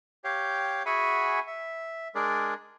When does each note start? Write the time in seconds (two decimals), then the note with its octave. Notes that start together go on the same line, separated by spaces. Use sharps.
0.24 G4 C#5 F5 G5
0.86 F#4 G#4 E5 F#5 G#5 B5
1.47 E5
2.15 G#3 D4 G#4 A#4 D5